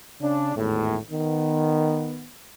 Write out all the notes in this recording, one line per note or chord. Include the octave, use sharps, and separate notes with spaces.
C#3 D4
G#1 E2 A2
D#3 B3